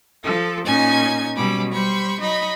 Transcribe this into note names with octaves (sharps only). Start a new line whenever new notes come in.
F3 A4
A#2 C#4 D#4 G#5 G#6
B2 F#3 G3 C#4 B5 D6
G3 C5 B5 C#6
F#3 D#4 D#5 B5 C#6